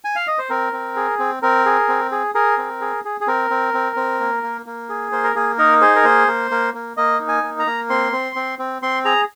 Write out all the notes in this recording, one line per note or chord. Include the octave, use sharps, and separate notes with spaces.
G#5
F5
D#5
C5
C4 A#4
C4
G#4
C4
C4 A#4
G#4
C4
G#4
G#4 A#4
C4
G#4
G#4
G#4
C4 A#4
C4
C4
C4
A#3
A#3
A#3
G#4
A#3 C5
A#4
A#3 G#4
D#4 A#4
G#4 C5
A#4
A#3 C5
A#3
A#3
A#3
A#3 D#5
D#4
G#5
A#3
A#5
A#3
C4 C6
C4
C4
C4
C4 C6
G#4 A#5